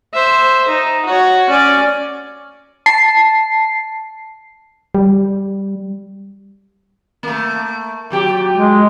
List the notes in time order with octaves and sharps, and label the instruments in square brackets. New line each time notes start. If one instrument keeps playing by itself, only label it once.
[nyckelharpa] C5 E5
D#4
F#4 C#5
C#4 D5
[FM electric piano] A5 C7
[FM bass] G3
[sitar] A3 A#3
A#2 F#3 G4
[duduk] G#3